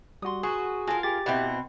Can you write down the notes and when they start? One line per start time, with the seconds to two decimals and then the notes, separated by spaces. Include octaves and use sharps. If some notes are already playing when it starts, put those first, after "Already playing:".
0.22 G3 F#4 C6 D#6
0.43 F#4 G#4 B4 C6
0.87 F4 F#4 A4 A#4 G#5
1.03 G4 G#4 A6
1.26 B2 B3 C4 E4 F#5 B5